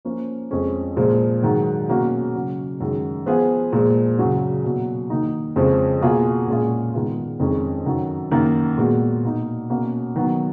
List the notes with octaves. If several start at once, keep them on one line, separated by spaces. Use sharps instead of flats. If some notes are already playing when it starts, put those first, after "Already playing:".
F3 A#3 C#4
F2 F3 G#3 C#4
A#2 F3 G#3
G#2 D#3 F#3
B2 A#3 C#4 F#4
C#3 F#3 C#4
F#2 D#3 G#3
F3 B3 F4 G#4
A#2 F3 G#3
F#2 C#3 F#3 C#4 F#4
B2 F#3 A#3
D#3 A#3 D#4
F2 C#3 F3 G#3 C#4
B2 A#3 F4 G#4
A#2 G#3 C#4 F4 G#4
G#2 D#3 G#3 B3 F4
F2 D#3 G#3 C#4
F#2 D#3 F#3
F#2 D#3 A#3
A#2 G#3 B3 F#4
B2 A#3 D#4
B2 A#3 C#4
D#3 F#3 B3